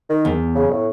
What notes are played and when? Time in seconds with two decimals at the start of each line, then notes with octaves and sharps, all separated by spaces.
0.09 D#3
0.25 E2
0.55 C#3
0.71 A2